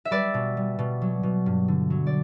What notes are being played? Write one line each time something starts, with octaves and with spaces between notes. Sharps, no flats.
E5
G3 B4 D5
B2
G3
B2
F#3
B2
G2
D3
F#3
D5